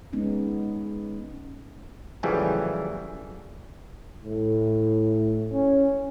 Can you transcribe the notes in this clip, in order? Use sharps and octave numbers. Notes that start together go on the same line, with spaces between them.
G#3 B3 C#4 D#4
F#2 A2 C#3 E3 F3 G3
A2
C#4